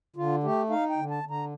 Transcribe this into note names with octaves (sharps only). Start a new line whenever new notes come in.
D3 F4
A3 G4
D#4 F5
G5
D3
A5
D3
A#5